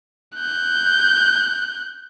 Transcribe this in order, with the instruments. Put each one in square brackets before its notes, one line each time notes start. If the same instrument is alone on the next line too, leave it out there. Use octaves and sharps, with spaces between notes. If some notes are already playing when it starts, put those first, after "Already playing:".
[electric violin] F#6 G6